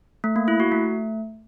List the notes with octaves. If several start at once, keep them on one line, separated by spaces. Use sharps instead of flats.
A3
A#3
E4
F#4
A3